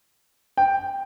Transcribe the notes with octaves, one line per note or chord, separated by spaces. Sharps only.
G5